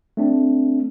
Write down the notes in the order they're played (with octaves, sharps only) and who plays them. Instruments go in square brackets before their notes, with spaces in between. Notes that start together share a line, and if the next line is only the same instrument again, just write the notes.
[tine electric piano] A3 C4 D4